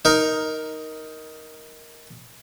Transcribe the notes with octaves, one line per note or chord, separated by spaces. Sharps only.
D#4 A#4